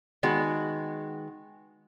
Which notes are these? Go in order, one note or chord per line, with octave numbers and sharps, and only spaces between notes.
D#3 G#3 B3 F#4